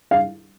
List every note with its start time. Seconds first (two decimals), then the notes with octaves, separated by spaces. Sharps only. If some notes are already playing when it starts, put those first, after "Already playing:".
0.11 F5